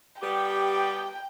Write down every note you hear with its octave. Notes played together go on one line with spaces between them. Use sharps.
G3 B3 G4 G5